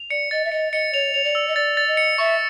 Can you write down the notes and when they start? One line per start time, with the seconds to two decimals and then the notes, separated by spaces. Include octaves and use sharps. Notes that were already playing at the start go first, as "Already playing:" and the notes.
Already playing: F7
0.10 D5 C#7
0.31 D#5 A6
0.45 E5
0.52 D#5 C#7
0.73 D#5 C#7
0.94 C#5 F7
1.14 C#5 F7
1.24 D5
1.35 E6
1.48 D#5
1.56 D5 A6
1.77 A6
1.88 D#5
1.97 C#7
2.18 E5 C#6